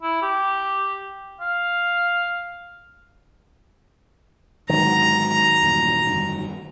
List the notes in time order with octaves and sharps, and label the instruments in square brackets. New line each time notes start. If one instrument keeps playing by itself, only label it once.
[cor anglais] E4
G4
F5
[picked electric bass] G#2 D3 [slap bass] D#3 F#3 [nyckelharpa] A#5
[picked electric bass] E2 G2 A#2
F1 G2 D3